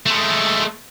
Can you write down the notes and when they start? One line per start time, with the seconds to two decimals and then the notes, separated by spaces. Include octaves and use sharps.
0.06 G#3 A3